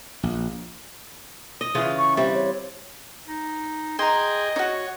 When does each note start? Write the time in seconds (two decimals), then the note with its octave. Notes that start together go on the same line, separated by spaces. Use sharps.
0.23 A#1
1.61 D#5
1.75 C#3 E3 F4
1.97 C#6
2.17 G3 C4 E5
2.35 C#5
3.28 D#4
3.99 G#4 D#5 G5 A#5 C6
4.56 D#4 F#4 C#5